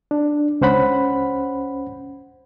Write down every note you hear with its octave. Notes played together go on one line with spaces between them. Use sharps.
D4
C#2 C#4 C5 F#5 B5